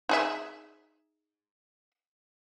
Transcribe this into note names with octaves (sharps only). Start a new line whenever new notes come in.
D#4 G#4 E5